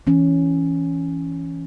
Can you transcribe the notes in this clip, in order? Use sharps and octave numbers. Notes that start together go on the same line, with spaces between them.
E3 C#4